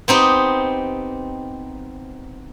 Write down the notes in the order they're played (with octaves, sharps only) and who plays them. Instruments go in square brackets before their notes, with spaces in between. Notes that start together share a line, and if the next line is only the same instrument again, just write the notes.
[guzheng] B3 C4 D#4 G4